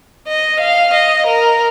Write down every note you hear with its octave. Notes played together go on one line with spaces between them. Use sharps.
D#5
F5
D#5
A#4